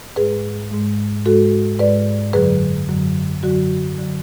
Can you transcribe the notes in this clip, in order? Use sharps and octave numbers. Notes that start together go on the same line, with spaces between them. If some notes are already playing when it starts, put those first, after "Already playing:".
G#2 G#3 G#4 B4
G#2 G#3
G#2 G#3 F#4 A4
G#2 G#3 B4 D5
F#2 D3 F#3 G#4 B4
F#2 D3 F#3
F#2 D3 F#3 F#4
D3 F#3